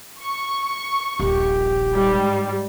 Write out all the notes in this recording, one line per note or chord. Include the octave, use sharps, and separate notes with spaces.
C#6
D#1 A#1 G4
G#2 G3